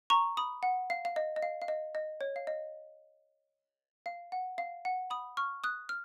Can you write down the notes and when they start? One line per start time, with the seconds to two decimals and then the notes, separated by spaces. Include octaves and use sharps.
0.10 A#5 C#6
0.37 B5 D#6
0.63 F#5
0.90 F5
1.05 F5
1.16 D#5
1.36 D#5
1.42 F5
1.62 F5
1.68 D#5
1.95 D#5
2.21 C#5
2.36 F5
2.47 D#5
4.06 F5
4.32 F#5
4.58 F5
4.85 F#5
5.10 B5 D#6
5.37 C#6 F6
5.64 D#6 F#6
5.89 F6